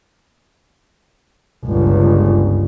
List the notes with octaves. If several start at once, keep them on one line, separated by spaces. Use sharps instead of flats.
G1 C#2